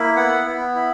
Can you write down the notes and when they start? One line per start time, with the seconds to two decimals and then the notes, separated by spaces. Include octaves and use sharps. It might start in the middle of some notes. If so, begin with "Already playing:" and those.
Already playing: A#3 E4
0.16 B3 F#5
0.46 B3
0.75 E4